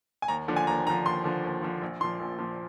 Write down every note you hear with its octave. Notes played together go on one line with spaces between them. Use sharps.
G#5
D#2 A#5
D3 F3
G#5
D#2 A#5
D3 F3 A#5
D#2 C6
D3 F3
D#2
D3 F3
A#1
A#2 F3 C6
A#1
A#2 F3